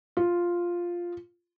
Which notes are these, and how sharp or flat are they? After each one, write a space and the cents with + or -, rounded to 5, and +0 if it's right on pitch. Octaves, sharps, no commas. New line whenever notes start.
F4 +0